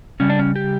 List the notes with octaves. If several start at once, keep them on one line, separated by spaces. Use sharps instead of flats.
C#3 G3 C#4
D4
C#4
G4